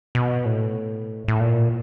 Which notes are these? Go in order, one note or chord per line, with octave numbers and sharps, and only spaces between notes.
B2
A2
A2
A#2